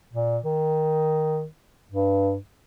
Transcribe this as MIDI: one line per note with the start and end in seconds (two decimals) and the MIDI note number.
0.13 0.38 46
0.44 1.45 51
1.92 2.36 43